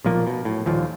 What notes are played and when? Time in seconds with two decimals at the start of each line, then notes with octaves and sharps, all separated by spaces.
0.04 B1 A#2 F3 A#3
0.27 B2
0.45 A2
0.66 D#1 D#2 A#2 F3